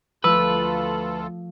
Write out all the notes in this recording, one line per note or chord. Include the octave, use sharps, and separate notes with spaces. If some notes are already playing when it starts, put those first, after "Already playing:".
D2 F3 A3 F4 A4 B4 E6